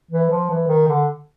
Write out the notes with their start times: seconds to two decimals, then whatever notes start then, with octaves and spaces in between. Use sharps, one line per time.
0.11 E3
0.30 F3
0.50 E3
0.68 D#3
0.88 D3